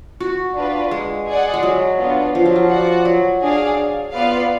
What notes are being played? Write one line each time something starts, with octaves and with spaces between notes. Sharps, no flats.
F#4
D4 F4 B4
G#3
G#4 D5 F#5
G#3
F#3
B3 D4 F4
F3
F#3
F3
F#4 D5 F#5
F#3
D4 G#4 D5 F5
B3 F4 B4 D5 F5